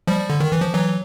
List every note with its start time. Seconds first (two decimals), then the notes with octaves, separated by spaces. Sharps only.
0.07 F3 G3
0.30 D3
0.40 D#3
0.52 E3
0.62 F3
0.73 E3 F#3